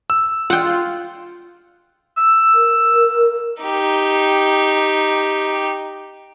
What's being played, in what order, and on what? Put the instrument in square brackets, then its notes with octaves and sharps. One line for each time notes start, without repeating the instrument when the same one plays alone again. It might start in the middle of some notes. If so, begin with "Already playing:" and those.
[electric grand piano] E6
[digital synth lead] F4 [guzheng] F#5 G5
[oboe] E6
[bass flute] A#4
[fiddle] D#4 G4